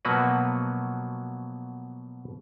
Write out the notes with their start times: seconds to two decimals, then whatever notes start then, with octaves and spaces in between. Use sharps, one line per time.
0.05 B2 F3 F#3 A#3 F#4 B4